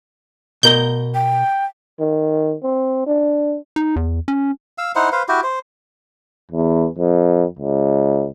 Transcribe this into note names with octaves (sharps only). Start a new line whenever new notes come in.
B2 A#4 A#5 G6
G5
D#3
C4
D4
D#4
E2
C#4
F5 E6
D#4 E4 C5 F#5
B4 C5 F5
E4 F#4 G4
C5
E2
F2
C#2